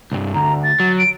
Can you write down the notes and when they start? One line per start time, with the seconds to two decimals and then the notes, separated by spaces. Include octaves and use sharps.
0.12 C2 G2
0.34 D2 A#5
0.63 A6
0.80 F#3
0.99 D7